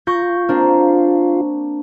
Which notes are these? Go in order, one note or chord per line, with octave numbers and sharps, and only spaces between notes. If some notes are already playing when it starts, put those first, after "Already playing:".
F4 C#6 G6 A#6
A#3 C4 D4